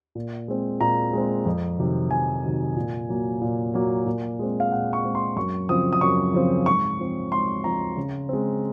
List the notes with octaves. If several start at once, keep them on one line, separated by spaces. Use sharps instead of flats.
A#2
G#3 C4
A#2 A#5
G#3 C4
F2
C3 D#3 F#3
F2 G#5
C3 D#3 F#3
A#2
F#3 A#3
A#2
F#3 A#3
A#2
G#3 C4
F5
A#2 F#5
C#6
G#3 C4
C6
F#2 C#6
C#3 F3 C4 D#6
D#6
F#2 C#6
C#3 F3 C4
G#2 C#6
F3 C4
G#2 C6
F3 C4 A#5
C#3
G#3 C4